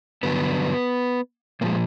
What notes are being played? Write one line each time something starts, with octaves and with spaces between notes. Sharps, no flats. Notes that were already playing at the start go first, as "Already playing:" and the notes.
G2 D3 F#3 B3
A#2 F3 G#3 A#3